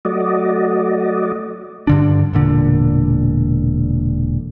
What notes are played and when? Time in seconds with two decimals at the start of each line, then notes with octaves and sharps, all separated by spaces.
0.05 F#3 A3 F#4 D5 D#5
1.87 G2 D3 D4
2.33 E1 A#2 D3